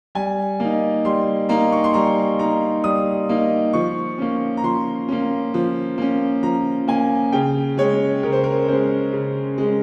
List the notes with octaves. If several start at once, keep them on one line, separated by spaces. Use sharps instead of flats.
G3 G#5
A#3 D#4
G3 C6
A#3 D#4 A#5
C#6
C6
G3 A#5
A#3 D#4 A#5
G3 D#6
A#3 D#4
F3 C#6
A#3 C#4
A#5
F3 C6
A#3 C#4
F3
A#3 C#4
F3 A#5
A#3 C#4 G#5
C#3 G5
G#3 C#4 C#5
C#3 A#4
C5
A#4
G#3 C#4 C5
C#3
G#3 C#4